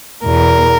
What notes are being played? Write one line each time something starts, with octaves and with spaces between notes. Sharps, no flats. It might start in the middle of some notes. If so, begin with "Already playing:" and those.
E2 B2 A#4